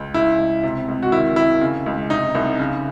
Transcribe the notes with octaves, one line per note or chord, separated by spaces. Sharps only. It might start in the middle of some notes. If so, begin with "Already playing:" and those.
Already playing: C#2
C#3 E4
C#2
C3
C#2
F#4
D#3 E4
D#3 E4
C#3
C#2
C3 D#4
C2
C#3